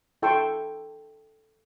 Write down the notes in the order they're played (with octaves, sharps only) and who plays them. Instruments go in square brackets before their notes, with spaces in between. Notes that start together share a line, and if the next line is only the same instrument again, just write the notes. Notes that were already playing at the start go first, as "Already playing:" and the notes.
[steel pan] E4 A4 G5 C6 C#6 E6